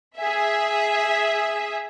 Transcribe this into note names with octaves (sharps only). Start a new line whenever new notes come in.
G#4 E5